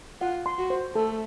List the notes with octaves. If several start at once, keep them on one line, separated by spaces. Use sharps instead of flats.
F4 F#5
C6
F#4
C5
A3 A4